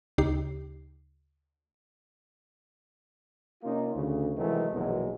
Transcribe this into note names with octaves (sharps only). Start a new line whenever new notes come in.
D2 C#3 D#4 G4 C7
C3 A#3 C#4 D#4 F4
D2 C#3
C3 D#3 E3 F#3 G#3 A3
A#1 E2 B2 D#3 F#3 G#3